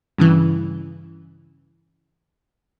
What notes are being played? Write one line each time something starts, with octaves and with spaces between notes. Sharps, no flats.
G2 C#3 E3